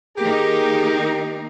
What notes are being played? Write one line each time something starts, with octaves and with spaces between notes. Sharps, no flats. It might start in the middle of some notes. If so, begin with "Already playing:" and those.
D#3 A#3 D#4 G4 G#4 A#4